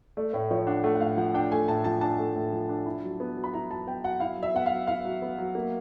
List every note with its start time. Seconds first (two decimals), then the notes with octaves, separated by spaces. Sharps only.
0.17 A3 D5
0.33 A2 C#5
0.51 F3 C#5
0.67 D4 F#5
0.83 A3 F#5
0.95 F#5
1.00 A2 F5
1.17 F3 F#5
1.34 D4 G5
1.51 A3 G#5
1.68 A2 A5
1.84 F3 A5
2.01 D4 A5
2.19 A3
2.36 A2
2.52 F3
2.69 D4
2.86 E4
3.03 F#3
3.20 B3
3.37 F#3
3.44 B5
3.53 E4 A#5
3.70 F#3 A5
3.87 B3 G5
4.04 F#3 F#5
4.20 E4 F5
4.38 F#3
4.43 E5
4.54 B3 F#5
4.66 F5
4.71 F#3
4.87 E4 F5
5.05 F#3
5.22 B3
5.38 F#3
5.55 A#3